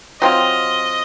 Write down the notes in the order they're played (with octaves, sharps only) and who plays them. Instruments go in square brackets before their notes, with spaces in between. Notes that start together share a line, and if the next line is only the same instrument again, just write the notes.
[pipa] F#3 C4 F4 [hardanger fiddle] D#5